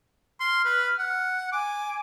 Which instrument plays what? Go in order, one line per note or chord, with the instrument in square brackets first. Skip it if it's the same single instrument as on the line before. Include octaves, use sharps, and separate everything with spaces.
[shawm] C6 [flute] F6
[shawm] B4
F#5
[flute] G#5 [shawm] D6